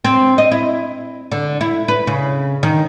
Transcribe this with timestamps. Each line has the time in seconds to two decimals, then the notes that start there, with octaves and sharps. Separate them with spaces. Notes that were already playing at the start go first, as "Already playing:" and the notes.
0.04 C4
0.38 D#5
0.52 E4
1.32 D3
1.61 E4
1.88 B4
2.07 C#3
2.63 D#3